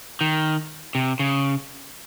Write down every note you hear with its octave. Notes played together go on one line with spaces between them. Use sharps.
D#3
C3
C#3